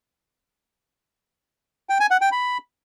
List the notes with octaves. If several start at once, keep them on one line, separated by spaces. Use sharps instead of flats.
G5
G#5
F#5
G5
B5